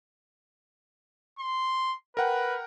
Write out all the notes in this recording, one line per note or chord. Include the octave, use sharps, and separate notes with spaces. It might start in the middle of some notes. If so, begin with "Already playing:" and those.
C6
A#4 B4 F#5 G5